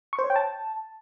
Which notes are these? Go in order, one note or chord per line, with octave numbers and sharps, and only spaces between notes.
C#6
C5
C#5
G5
A5